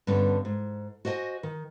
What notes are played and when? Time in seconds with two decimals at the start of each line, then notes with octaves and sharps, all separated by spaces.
0.07 G2 D3 B3 C#4
0.45 G#2
1.05 F#4 C5 D#5 G5 G#5
1.43 D#3